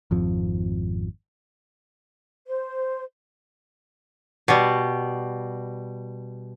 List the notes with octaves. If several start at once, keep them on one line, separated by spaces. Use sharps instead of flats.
G#1 F2 F3
C5
B2 G3